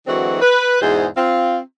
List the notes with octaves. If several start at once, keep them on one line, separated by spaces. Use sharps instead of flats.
D3 E3 F#3 G#3 C4 F#4
B4
E2 G#2 B2 G#4 C5
C4 F4